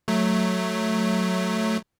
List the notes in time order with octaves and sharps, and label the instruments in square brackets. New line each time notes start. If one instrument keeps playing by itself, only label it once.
[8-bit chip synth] F#3 A3